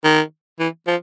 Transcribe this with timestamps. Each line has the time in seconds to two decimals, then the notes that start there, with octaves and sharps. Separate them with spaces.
0.04 D#3
0.60 E3
0.87 F3